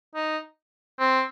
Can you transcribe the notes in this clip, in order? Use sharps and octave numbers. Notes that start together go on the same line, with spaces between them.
D#4
C4